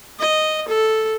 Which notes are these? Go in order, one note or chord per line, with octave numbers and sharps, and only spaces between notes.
D#5
A4